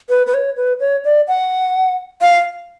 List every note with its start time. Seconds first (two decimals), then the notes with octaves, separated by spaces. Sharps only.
0.09 B4
0.27 B4
0.34 C#5
0.57 B4
0.80 C#5
1.05 D5
1.28 F#5
2.22 F5